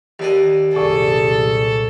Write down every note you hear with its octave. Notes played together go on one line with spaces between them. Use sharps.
D#2 D4 D#5
C2 F#2 A#2 G#4 A4 D5 C#6